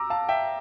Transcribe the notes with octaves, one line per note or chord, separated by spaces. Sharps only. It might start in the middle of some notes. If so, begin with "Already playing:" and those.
Already playing: A#5 D6 E6
F5 A5
E5 G5